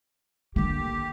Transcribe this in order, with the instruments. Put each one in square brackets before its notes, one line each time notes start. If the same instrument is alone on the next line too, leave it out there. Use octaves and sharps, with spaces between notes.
[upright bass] D3 A#3 [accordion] G4